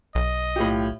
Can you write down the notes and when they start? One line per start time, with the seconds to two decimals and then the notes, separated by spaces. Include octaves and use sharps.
0.15 B1 D#5
0.56 A2 F4 G4